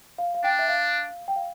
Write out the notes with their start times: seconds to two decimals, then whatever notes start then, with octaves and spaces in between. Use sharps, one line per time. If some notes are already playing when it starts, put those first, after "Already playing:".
0.18 F5
0.34 F5
0.43 D4 G5
0.59 E5
0.69 F5
1.28 G5
1.36 F5